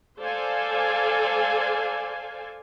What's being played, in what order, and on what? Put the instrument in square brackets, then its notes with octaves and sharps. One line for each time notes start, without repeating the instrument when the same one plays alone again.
[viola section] A4 C5 D5 F5 G#5